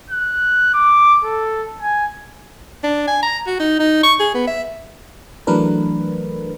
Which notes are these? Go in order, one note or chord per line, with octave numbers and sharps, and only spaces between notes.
F#6
D6
A4
G#5
D4
G#5
A#5
F#4
D#4
D#4
C#6
G#4
B3
E5
E3 F#3 A3 D4 A#4 B4